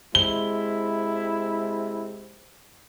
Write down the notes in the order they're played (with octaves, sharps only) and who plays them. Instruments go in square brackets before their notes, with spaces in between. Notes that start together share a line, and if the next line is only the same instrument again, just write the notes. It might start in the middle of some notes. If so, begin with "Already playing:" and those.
[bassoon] C3 [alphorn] G#3 [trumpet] E4 [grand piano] G7